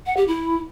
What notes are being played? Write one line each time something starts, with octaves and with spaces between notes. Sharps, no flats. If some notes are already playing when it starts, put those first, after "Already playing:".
F#5
G4
E4